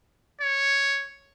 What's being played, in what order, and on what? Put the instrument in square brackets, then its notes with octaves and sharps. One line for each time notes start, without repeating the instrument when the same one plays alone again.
[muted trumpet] C#5